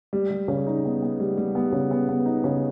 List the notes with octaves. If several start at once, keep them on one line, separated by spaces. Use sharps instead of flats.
G3
G3
C#3
D#4
B3
B3
G3
G3
B3
C#3
B3
B3
D#4
C#3